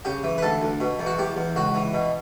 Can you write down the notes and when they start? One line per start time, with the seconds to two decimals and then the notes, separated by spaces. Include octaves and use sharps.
0.05 C#3 G4
0.23 E3
0.38 B4
0.42 D2 A4
0.62 D2
0.80 B2
0.99 E2
1.06 F#4
1.18 E2 G4
1.37 E2
1.56 C#2 F#4
1.75 E3
1.93 B2